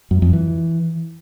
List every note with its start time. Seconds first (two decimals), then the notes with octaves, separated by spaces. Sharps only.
0.11 F#2
0.22 F2
0.33 E3